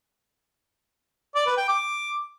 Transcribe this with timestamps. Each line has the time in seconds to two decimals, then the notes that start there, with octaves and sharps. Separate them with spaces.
1.35 D5
1.46 B4
1.57 G5
1.69 D6